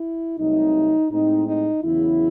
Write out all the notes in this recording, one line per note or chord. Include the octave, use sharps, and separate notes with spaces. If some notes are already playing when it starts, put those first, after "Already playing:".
Already playing: E4
C2 C3 F#3 A3 D#4
A2 G#3 C4 D#4
D#4
E2 C#3 F#3 E4